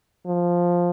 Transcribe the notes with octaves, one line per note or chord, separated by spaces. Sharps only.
F3